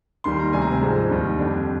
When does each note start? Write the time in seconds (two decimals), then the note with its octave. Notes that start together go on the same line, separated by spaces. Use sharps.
0.24 D#2 D#3 G3 C6
0.39 A#5
0.53 D2 C3 G3 D4 G#5
0.62 A#5
0.71 G#5
0.82 G#2 F3 G#3 C4 A#5
1.10 D#2 D#3 G3
1.38 F2 D3 G3 D4